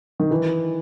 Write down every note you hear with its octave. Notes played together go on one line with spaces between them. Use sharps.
D#3
E3